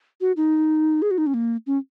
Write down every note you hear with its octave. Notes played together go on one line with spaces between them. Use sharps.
F#4
D#4
G#4
F#4
D#4
C#4
A#3
C#4